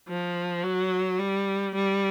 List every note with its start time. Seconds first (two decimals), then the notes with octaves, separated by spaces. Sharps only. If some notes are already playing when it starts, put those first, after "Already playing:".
0.09 F3
0.64 F#3
1.19 G3
1.75 G3